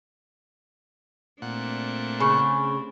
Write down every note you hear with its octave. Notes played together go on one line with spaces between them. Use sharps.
A#2 A3 C4 D4 F#5
C#3 B5 C#6